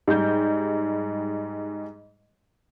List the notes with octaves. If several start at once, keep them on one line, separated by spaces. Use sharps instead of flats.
G#2 G3 G6